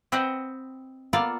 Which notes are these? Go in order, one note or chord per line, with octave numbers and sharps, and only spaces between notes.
C4 B4 C5 D#5 F#5 G5
A#3 B3 F4 A4 D5 F5